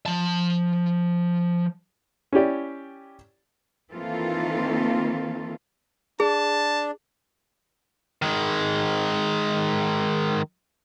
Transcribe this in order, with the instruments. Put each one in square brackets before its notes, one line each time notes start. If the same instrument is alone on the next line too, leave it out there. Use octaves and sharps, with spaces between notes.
[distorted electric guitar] F3 A5
[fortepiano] C#4 E4 G4 D5
[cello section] D#3 E3 A#3 C4 F4 A4
[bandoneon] D4 [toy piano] G#4 [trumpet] A5
[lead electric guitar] D#3 G#3